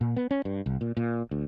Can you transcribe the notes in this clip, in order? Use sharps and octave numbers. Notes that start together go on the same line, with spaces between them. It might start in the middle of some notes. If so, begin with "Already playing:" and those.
A#2
B3
C#4
G2
C2
A#2
A#2
D2